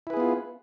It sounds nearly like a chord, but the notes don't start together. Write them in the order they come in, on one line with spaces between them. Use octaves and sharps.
E4 B4 G#4 B3 F4